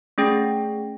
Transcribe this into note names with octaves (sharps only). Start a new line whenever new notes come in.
A3 C#4 G#4 G5 A#6